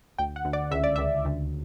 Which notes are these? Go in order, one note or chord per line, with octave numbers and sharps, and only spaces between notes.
D2 G5
F#5
D2
D5
C#2 E5
D5
C#2 E5
D2